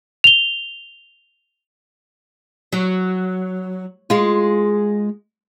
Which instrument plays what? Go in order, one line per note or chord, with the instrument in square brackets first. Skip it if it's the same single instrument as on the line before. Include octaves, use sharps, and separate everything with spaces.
[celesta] F7 G7
[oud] F#3
G#3 F4